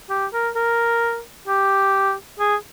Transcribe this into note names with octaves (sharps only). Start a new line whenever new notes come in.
G4
A#4
A#4
G4
G#4